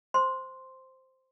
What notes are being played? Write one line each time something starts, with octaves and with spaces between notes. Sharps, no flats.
C5 C6